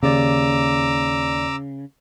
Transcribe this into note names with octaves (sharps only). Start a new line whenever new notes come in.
D#2 C#3 D5 A#5 D6 E6